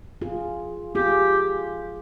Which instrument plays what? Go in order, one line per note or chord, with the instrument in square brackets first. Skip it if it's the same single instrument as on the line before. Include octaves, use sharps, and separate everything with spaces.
[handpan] F4 G#4
[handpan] F4 G#4 [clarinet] G4